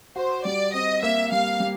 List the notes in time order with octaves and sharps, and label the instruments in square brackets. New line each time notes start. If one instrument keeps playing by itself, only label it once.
[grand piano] F#4 [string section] C5
[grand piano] G3 [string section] D5
[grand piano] C4 [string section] D#5
[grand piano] A#3 [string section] E5
[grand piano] G3 [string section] F5
[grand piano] G3